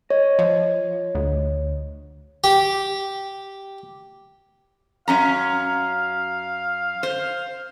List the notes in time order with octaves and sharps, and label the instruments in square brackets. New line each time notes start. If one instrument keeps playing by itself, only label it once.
[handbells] C#5 [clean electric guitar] D#5
[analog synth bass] F3
D2
[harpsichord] G4
[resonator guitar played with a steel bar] F#2 C#4 A#5 [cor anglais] F5
[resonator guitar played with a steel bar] C5